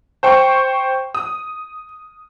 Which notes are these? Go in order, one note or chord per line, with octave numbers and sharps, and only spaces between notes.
C5 G5 C#6
D#6